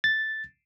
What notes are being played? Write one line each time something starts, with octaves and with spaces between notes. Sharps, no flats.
A6